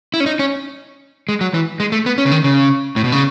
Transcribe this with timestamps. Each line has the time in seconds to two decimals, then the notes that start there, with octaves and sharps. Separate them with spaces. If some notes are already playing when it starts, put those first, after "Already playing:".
0.14 E4
0.20 C#4
0.26 D#4
0.39 C#4
1.29 G#3
1.41 F#3
1.54 E3
1.80 G#3
1.92 A3
2.06 B3
2.18 C#4
2.26 C#3
2.32 D#3
2.44 C#3
2.96 A2
3.04 B2
3.12 C#3